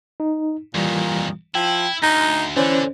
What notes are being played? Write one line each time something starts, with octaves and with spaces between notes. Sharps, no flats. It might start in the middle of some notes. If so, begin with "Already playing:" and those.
D#4
F2 A#2 D#3 E3 G3
F3 E4 G5
D2 D#4 A#6
D3 E3 C#4 C5 D5